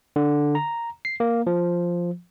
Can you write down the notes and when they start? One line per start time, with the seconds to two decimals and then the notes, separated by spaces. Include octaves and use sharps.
0.16 D3
0.55 A#5
1.05 C7
1.20 A#3
1.47 F3